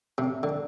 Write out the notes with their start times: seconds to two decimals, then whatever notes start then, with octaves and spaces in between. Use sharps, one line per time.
0.18 C3
0.43 D3